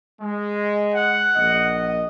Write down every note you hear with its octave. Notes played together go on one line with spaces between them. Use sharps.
G#3
F#5
A#1 D#5